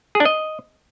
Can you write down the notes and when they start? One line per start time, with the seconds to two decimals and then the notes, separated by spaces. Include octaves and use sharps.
0.15 G#4
0.20 D4
0.25 D#5